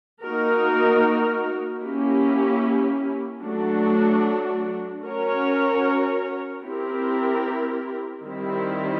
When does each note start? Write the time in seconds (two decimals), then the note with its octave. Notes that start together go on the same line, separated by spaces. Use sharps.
0.22 A#3 D#4 F#4 A#4
1.82 A#3 C#4 E4 G4
3.43 F#3 A3 D4 F#4
5.03 C#4 F#4 A#4 C#5
6.64 C4 E4 G4 A#4
8.24 D#3 G3 C4 E4